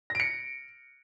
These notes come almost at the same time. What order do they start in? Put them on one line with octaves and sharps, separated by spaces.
A#6 D7 C#7